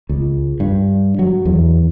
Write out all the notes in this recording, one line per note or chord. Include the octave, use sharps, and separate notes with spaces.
C#2
G2
F#3
E2